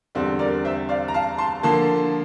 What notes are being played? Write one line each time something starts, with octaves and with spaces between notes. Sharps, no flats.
E2 D3 G3 C4
A#4 D5
C5 E5
D5 F5
A#5
F5 A5
A5 C6
D3 F3 A#3 A5 C6